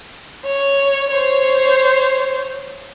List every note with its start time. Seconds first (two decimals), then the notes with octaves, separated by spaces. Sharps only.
0.46 C#5
1.12 C5 C#5